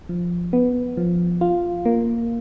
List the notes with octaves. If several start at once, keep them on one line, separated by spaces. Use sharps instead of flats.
F3
B3
F3
F4
A#3